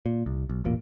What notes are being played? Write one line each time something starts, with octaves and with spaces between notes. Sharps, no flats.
A#2
C2
B1
E1 A1 A#2 A#3